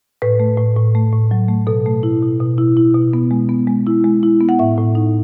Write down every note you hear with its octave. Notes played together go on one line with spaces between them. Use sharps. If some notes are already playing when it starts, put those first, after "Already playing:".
A2 B4
A3
A2
A2
A3
A2
F#3
A3
B2 A4
A3
E4
B2
B2
E4
E4
B2
B3
G#3
B3
G#3
E4
G#3
E4
B3
F#5
A2 E5
A2
D#4